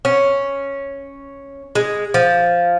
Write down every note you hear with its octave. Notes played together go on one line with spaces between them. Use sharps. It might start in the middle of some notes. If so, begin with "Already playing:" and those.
C#4
G#3
F3